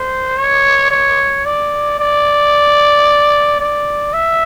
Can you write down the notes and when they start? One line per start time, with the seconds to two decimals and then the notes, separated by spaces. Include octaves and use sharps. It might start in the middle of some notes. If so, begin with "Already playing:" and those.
Already playing: C5
0.37 C#5
0.91 C#5
1.45 D5
1.99 D5
3.60 D5
4.13 E5